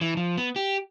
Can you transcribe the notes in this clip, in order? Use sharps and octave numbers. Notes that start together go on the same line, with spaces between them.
E3
F3
B3
G4